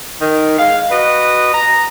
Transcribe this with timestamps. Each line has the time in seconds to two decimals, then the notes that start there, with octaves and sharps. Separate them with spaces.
0.21 D#3
0.59 G#3 F5
0.91 F#4 B4 D#5
1.54 A#5